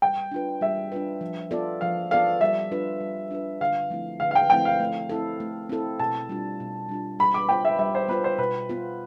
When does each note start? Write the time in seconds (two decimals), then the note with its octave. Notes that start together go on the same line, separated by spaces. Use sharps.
0.02 G3 G5
0.32 D4 F4 B4
0.61 G3 E5
0.92 D4 F4 B4
1.21 F3
1.51 B3 F4 A4 D5
1.81 F3 F5
2.11 B3 F4 A4 D5 F5
2.41 G3 E5
2.71 D4 F4 B4
3.01 G3
3.31 D4 F4 B4
3.61 D3 F5
3.90 F3 A3 C4 E4
4.20 D3 F5
4.31 F5
4.35 G5
4.50 F3 A3 C4 E4 G5
4.65 F5
4.80 A3
5.09 C4 E4 A4
5.40 A3
5.69 C4 E4 A4
5.99 B2 A5
6.29 G3 D4 F4
6.60 B2
6.89 G3 D4 F4
7.19 G3 B5
7.34 D6
7.49 B3 F4 C5 G5
7.65 E5
7.79 G3 E5
7.95 C5
8.08 B3 F4 B4 C5
8.24 C5
8.38 B2 B4
8.69 B3 F4